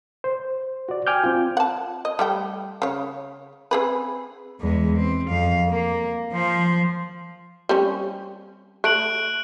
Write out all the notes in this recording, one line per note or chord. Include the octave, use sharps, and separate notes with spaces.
C5
F#4 D5
G5 G#5 D6 F6 G6
C4 F4
F#5 A5
D#5
G3 A3 G5
C#3 C#5
C4 G#4 B4
E2 G#3
C4
F2 F5
A#3
F3 C5
G3 C4 C#4
A3 F#6 D7 F#7